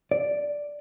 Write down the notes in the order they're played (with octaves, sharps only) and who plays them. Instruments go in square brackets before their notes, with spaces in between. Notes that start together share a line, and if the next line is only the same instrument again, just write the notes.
[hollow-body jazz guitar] D5